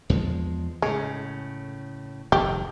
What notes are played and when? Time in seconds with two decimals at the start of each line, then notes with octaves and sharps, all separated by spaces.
0.10 E2 F3 G#3
0.82 A2 C#3 G#3
2.32 F1 G#2 D#3 G4